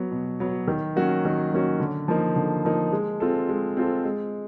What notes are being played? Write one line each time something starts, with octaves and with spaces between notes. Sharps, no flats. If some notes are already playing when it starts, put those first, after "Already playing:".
Already playing: F#3 B3
B2
F#3 B3
D#3
F#3 A#3 C#4 F#4
D#3
F#3 A#3 C#4 F#4
D3
F3 A#3 D#4
D3
F3 A#3 D#4
G#3
C4 F4 A4
G#3
C4 F4 A4
G#3